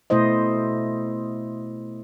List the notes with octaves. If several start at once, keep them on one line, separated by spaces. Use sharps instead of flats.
B2 A3 E4 C5 D#5